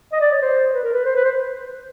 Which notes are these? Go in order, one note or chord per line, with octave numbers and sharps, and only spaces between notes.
D#5
D5
C#5
C5
B4
A#4
B4
C5
B4
C5